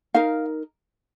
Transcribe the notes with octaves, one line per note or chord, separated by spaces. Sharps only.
D#4 A#4 F5